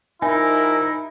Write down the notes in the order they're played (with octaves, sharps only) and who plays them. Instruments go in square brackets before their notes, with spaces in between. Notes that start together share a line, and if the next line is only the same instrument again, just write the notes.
[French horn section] F3 G4 A#4 [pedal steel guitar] D#4 [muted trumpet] E4 [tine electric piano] G#5